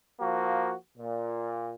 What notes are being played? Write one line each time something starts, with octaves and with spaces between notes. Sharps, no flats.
F3 A#3 F#4
A#2